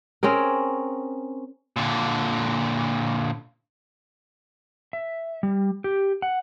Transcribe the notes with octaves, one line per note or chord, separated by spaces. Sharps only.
C4 C#4 G#4 A#4
A#2 D3
E5
G3
G4
F#5